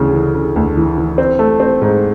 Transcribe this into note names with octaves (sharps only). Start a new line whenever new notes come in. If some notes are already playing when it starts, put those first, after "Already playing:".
Already playing: D2 C#3 E3
E3
C#3
D2
E3
E3
C4
A3
C4
G#2